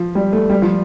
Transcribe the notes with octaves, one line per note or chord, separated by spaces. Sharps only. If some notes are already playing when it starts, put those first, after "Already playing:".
Already playing: F3
G3
A3
G3
F3